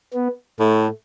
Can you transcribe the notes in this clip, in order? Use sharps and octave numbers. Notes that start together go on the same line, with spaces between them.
B3
A2 A3